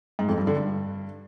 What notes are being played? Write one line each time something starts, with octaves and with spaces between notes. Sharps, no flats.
G#2
F2
G2
D3
G2